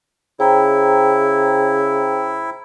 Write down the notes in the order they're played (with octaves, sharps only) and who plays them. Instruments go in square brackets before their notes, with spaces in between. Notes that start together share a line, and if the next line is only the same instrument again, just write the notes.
[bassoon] C#3 [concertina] E4 [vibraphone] C5 G5 A#5